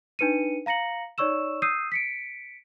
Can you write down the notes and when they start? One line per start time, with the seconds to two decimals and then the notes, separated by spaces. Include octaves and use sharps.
0.19 D4 D#4 B4 C#7 D#7
0.66 F5 A#5 A#6 C#7 F#7
1.18 D#4 C#5 D5 C#6 E6 E7
1.62 D#6 E6 G6 C7 D#7
1.92 B6 C#7 D7